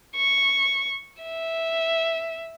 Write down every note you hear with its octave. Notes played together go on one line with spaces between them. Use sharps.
C#6
E5